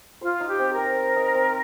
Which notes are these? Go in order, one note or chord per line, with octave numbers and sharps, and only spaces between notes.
F4 C5
D#4
G4
C4
A#4
C4
C5
D#4
C4